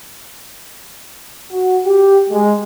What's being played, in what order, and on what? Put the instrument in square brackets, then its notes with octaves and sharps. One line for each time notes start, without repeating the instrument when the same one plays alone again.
[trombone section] F#4
G4
G#3